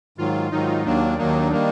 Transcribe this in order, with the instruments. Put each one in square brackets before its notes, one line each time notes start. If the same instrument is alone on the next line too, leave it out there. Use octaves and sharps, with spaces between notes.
[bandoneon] G#2 D#3 F#3 [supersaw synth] F4
[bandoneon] G#2 D#3 F#3 [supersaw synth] D#4
[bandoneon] D#2 D#3 F#3 A#3 [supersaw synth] D4
[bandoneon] D#2 D#3 F#3 A#3 [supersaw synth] D#4
[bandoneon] D#3 G3 A#3